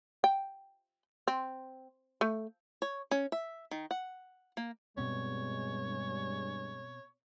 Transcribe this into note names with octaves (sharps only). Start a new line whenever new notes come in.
G5
C4
A3
C#5
C#4
E5
D#3
F#5
A#3
G2 B2 G#3 B3 C4 C#5